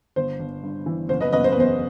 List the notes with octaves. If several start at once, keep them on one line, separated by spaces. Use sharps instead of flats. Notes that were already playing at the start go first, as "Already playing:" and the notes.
G1 C5
G1
G2
E3
F#1 C5
B4 D#5
F#1 B4 D#5
C5
B4
E2 C5